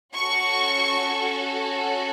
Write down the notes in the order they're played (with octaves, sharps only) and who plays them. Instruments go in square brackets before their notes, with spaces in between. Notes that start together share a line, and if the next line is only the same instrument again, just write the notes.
[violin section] C#4 F#4 A4 C#6